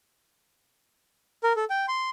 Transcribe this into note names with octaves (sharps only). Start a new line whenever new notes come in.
A#4
A4
G5
C6